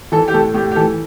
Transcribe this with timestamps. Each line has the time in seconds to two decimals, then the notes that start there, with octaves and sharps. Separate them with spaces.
0.12 E3 A4
0.28 G4
0.34 A2 A4
0.54 A2 G4
0.72 G4
0.76 E3 A4